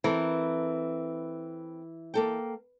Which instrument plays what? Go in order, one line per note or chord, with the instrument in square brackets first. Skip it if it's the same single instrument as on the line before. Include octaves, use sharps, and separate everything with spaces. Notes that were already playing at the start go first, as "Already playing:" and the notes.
[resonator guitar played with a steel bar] E3 [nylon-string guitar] C4 A4 A#4
[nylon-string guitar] A#3 A4 G5